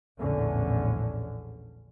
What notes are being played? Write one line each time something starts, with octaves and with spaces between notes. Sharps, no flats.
A#1 E2 A2 D3 C#4